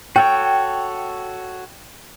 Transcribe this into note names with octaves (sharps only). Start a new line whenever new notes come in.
F#4 A4 C#5 G5